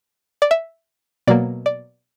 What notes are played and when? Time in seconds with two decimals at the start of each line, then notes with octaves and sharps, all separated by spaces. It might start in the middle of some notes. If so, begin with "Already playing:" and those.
0.42 D5
0.51 E5
1.27 B2 F#3 A#3 D5
1.66 D5